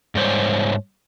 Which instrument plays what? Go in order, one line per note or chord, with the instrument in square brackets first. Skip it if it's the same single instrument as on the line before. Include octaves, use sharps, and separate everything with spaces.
[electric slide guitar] G#2 G3 C5 C#5